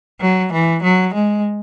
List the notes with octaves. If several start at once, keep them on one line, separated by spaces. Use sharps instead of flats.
F#3
E3
F#3
G#3